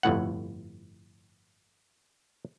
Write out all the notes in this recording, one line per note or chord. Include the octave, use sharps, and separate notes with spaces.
G1 F2 A2 F#5